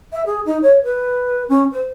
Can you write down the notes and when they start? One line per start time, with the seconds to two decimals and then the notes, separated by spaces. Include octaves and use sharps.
0.13 E5
0.26 G#4
0.46 D#4
0.62 C#5
0.84 B4
1.49 C#4
1.72 C5